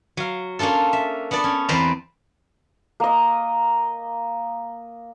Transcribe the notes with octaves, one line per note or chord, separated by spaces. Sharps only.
F#3 F5
A#3 C#4 D4 F4 A4
E5
B3 D4 A4 D5
C#4
E2 C4 B4 C5 D5 A#5
A#3 D#5